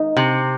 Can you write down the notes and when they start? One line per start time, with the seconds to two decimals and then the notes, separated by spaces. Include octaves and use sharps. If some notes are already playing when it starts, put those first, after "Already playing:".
Already playing: D#4
0.17 C3